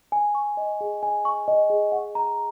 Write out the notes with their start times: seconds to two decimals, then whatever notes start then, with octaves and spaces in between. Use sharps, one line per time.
0.12 G#5
0.35 C#6
0.57 D#5
0.81 G#4
1.03 G#5
1.25 C#6
1.48 D#5
1.70 G#4
1.92 F#5
2.15 A#5